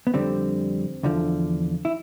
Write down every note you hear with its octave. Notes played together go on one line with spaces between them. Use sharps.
B3
F2 D3 G3 C4
E2 D3 F3
E4